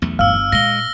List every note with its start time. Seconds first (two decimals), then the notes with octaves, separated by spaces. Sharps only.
0.02 B1 E2 A3
0.19 G1 F5 E6 F6
0.52 A#2 G#3 A#6 G7